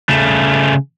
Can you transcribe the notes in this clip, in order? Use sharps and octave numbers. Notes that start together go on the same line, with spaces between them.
C#3 A3